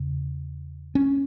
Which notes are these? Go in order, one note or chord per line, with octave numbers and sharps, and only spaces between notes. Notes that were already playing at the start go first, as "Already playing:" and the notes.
Already playing: E2 C#3
C#4